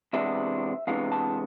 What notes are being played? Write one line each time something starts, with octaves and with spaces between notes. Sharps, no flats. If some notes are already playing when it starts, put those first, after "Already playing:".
E2 C3 G#3 B3 D4 E5
E2 C3 G#3 B3 D4 F5
A5